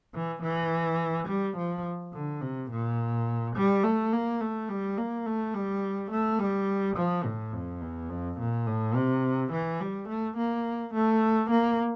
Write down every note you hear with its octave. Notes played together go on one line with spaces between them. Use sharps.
E3
E3
G3
F3
D3
C3
A#2
G3
A3
A#3
A3
G3
A#3
A3
G3
A3
G3
F3
A2
F2
E2
F2
A#2
A2
C3
E3
G3
A3
A#3
A3
A#3